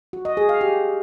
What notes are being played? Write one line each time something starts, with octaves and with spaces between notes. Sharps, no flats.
F#4
D#5
G#4
F5
G4